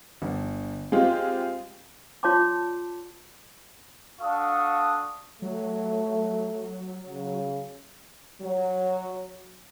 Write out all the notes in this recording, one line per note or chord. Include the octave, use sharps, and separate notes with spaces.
G1
G#3 C4 F4 G4
F4 C#5 D5 A5 C6 D6
D4 F#4 A4 F5 C#6 D#6
F#3 A3
C#3
F#3